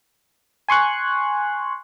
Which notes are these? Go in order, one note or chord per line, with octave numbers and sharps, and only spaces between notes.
G#5 C6 C#6 F#6